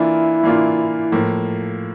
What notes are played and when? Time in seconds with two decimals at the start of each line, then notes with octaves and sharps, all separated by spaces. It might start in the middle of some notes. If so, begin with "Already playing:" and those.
Already playing: E3 A#3 D4 E4 F4
0.43 E3 A#3 D4 F4
1.12 A2 F3 A#3